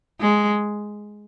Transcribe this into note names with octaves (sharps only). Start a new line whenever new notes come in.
G#3